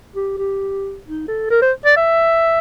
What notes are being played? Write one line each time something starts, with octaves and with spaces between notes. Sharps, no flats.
G4
G4
D#4
A4
A#4
C5
D5
E5